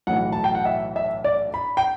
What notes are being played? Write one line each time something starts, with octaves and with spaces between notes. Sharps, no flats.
B1 A2 E3 F#5
A5
G5
F#5
E5
E5
D5
B5
G5